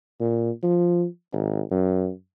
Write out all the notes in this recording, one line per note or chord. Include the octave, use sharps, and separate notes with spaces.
A#2
F3
G#1
F#2